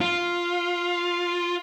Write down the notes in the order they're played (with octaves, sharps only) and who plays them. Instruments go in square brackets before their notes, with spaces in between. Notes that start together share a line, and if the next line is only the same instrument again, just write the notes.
[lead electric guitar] F4